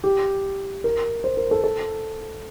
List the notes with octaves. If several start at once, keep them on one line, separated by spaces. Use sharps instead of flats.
G4
A#4
C5
A#4
A4
A4